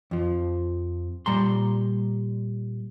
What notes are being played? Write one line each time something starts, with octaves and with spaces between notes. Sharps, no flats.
F2 F3
A#2 G3 A#5 C6